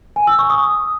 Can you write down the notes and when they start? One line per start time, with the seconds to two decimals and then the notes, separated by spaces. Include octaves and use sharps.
0.16 G#5
0.27 E6
0.39 C#6
0.50 D#6